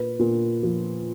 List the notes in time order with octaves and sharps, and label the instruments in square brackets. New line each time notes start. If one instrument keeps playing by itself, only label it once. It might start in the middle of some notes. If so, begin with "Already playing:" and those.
Already playing: [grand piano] A#2 B4
A#2
F3